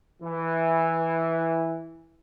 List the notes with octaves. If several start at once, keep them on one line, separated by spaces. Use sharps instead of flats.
E3